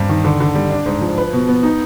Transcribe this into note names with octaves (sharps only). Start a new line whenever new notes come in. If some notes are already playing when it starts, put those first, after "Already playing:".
Already playing: G2 C4
D#3
D3
D3
G3
D4
G#2
F3
B4
B2
B3
D#4